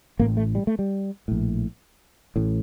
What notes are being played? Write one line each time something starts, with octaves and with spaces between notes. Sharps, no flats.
A1 A2 A#3
A3
G3
A3
G3
A#1 A2
A1 A2